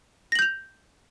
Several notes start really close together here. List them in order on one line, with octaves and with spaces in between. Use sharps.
A#6 F#7 G6 F7